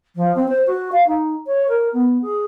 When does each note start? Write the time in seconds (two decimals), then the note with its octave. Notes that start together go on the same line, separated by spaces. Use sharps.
0.15 F3
0.35 C4
0.48 C5
0.67 F#4
0.92 F5
1.07 D#4
1.47 C#5
1.68 A#4
1.93 B3
2.21 G#4